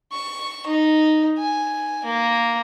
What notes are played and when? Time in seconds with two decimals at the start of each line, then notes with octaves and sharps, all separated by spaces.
0.13 C#6
0.66 D#4
1.38 G#5
2.05 A#3